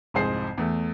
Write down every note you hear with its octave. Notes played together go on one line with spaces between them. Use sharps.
C2 F2 G#2 G#4 C5 C7
E2 A3